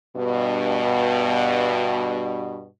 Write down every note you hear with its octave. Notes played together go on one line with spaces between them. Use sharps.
G2 B2